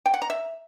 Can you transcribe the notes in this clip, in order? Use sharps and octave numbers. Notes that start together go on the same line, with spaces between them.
G5
F#5
A#5
E5